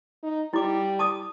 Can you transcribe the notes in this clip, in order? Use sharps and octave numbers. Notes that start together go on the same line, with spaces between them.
D#4
G3 E4 D6
A5 D6 D#6